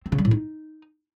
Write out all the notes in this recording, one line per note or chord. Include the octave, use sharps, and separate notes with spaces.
C4
C#3
G3
A2
D#4